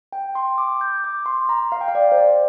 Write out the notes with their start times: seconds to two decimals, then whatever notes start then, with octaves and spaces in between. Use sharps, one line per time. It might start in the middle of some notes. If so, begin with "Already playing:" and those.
0.13 G5
0.35 C6
0.58 D6
0.81 G6
1.04 D6
1.26 C6
1.49 A#5
1.72 F5
1.81 G5
1.88 F5
1.95 D5
2.12 C5
2.17 D5